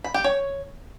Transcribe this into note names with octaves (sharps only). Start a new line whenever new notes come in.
B5
G4
C#5